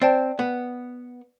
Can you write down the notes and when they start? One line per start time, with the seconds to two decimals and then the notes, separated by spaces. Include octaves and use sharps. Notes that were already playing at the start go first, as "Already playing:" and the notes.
0.02 C4 D5 G5 A5
0.39 B3